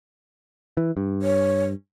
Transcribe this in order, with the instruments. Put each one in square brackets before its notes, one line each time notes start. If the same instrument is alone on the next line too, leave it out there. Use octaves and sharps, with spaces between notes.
[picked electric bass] E3
G2
[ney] C#5